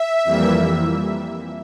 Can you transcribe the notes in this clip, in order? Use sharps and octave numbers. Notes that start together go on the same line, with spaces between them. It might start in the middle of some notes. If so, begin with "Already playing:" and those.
Already playing: E5
F2 E3 G3 A#3